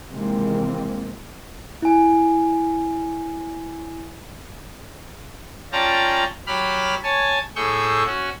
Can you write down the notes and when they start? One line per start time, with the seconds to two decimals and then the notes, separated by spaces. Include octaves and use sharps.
0.11 C3 D#3 E3 G#3 A#3 C4
1.82 E4 G#5
5.72 C#4 F4 D5 G5 A5 A#5
6.47 F#3 G4 B5 F6
7.03 C#5 G#5 A5
7.56 A2 G#4 C#6 E6 G6
8.06 C#4 F#4